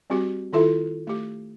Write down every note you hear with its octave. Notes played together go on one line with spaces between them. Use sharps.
G3 C4 F#4 G4
D#3 E4 F4 A4 E5
A3 G4